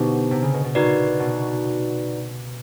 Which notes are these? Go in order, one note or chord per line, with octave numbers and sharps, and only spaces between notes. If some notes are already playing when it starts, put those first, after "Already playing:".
Already playing: B2 D3 B3 D#4 G4 C5
C3
C#3
B2
B2
A#2 D#4 F#4 B4 D5
B2